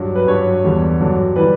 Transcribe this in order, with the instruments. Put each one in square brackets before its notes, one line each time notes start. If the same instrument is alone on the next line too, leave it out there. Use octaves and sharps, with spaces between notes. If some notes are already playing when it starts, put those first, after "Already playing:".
Already playing: [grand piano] G2 F#3
B4
G2 F#3 C#5
E2 D3 G3
G2 D3 F#3
E3 G3 B4